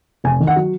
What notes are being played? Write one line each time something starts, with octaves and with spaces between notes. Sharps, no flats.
F1 G#5
D#3
F#5
F#3